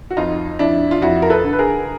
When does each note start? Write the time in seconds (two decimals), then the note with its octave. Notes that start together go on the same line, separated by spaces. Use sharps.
0.11 F#4
0.17 F2 D#4 F4
0.59 F2 D4 E4
0.91 F4
1.02 F2 E4 F#4
1.22 A#4
1.30 A4 B4
1.44 D3
1.53 B4
1.59 G#4 A#4